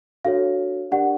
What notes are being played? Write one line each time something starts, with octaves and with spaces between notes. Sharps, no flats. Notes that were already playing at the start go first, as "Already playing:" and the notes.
D4 F#4 A4 C#5 F5
D4 G4 A#4 D5 F#5